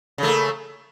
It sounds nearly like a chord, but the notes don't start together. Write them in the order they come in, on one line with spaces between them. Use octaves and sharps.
C#3 A3 A#3